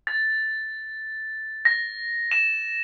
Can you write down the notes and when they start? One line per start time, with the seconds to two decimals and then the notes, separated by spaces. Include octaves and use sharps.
0.07 A6
1.65 A#6
2.31 E7